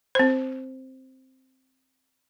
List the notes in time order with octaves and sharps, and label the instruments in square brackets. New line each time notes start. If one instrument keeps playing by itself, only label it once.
[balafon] C4 C5